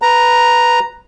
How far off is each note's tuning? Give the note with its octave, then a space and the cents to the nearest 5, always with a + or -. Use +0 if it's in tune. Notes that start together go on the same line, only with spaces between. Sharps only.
B4 +0 A#5 +0